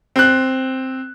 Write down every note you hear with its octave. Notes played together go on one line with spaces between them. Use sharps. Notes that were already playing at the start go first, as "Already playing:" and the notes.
C4 F#6